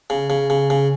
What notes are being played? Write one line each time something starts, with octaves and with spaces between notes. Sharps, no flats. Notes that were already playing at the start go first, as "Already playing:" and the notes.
C#3
C#3
C#3
C#3